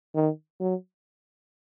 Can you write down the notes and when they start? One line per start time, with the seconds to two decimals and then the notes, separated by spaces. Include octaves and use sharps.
0.15 D#3
0.60 F#3